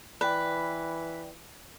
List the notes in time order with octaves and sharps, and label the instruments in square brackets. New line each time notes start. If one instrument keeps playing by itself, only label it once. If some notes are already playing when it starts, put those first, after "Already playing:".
[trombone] E3 [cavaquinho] B4 [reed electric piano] D5 G5